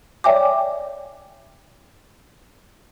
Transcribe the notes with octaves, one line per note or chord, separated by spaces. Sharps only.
C#5 D5 E5 G5 G#5 D6